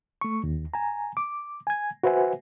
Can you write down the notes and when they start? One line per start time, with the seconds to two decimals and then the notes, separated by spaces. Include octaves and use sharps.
0.21 A3 C#6
0.44 D#2
0.74 G#5 A#5
1.17 D6
1.67 G#5 G#6
2.03 F#4 B4 C5 E5 F#5 G#5